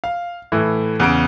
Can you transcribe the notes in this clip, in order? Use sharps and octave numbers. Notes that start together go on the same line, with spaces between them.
F5
A2 E3 A3
E2 C#3 D7